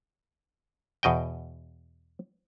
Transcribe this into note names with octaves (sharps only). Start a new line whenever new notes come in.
E2 B2 D#5 G5